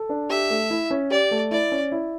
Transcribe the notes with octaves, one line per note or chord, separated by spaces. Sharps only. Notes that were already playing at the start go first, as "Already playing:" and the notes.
Already playing: A4
D4
G4 E5
A3
E4
C#4
G4 D5
A3
E4 D5
C#4
E4